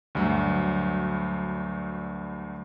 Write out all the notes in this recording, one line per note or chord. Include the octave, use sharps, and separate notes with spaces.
D2 G2 F#3